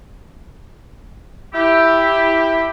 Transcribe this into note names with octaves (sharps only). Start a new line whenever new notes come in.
E4 G4